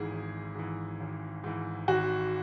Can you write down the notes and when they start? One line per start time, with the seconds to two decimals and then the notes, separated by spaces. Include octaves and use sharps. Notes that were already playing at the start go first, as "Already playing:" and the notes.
Already playing: G#1 G#2 E3 G#4
0.11 G#1
0.55 G#2 E3
1.01 G#1
1.44 G#2 E3
1.88 G#1 F#4